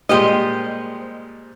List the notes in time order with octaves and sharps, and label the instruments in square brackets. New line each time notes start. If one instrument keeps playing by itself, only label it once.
[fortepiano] A#2 G3 G#3 [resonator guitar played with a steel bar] G4 C5 D#5